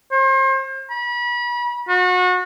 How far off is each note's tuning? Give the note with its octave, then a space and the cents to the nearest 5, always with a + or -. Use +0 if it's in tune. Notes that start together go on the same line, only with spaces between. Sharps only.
C5 +35
B5 -35
F#4 -30